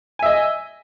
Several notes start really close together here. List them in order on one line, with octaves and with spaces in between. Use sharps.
G#5 E5 D#5